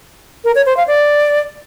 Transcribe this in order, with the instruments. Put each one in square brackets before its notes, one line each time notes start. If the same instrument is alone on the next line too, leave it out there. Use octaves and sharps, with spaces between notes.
[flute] A#4
C#5
C5
F5
D5